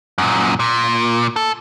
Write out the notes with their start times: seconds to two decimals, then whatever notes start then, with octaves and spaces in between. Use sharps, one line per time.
0.18 F#2 A#2
0.60 A#2
1.36 A4